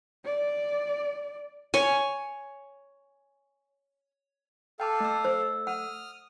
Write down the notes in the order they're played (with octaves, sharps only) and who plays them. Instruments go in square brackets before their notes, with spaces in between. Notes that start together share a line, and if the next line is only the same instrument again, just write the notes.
[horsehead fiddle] D5
[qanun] C#5 G#5
[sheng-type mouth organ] A4 F5 [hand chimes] G5 A5 D6
[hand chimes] A3 E6
[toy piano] C5
[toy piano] F#5 [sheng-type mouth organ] D#6 F6